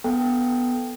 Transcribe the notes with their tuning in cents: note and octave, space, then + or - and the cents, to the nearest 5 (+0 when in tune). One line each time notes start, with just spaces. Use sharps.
B3 +0 A4 +0 G5 +0